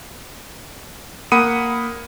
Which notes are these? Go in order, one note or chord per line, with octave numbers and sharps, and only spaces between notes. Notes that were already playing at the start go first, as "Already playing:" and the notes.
A#3 F#5 B5 D#6 C#7 D#7